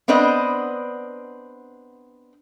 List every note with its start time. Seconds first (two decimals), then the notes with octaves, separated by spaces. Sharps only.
0.08 B3 C4 D4 B4 D#5